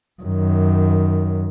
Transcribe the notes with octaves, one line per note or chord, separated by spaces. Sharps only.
F#2 D#3